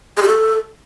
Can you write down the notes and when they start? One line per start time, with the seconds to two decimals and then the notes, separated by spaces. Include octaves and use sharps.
0.17 G#4
0.23 G4
0.28 A4